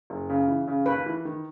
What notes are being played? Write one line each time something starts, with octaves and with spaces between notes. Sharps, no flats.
F#1
C#3
E3
C#3
D#2 B4
E3
D#3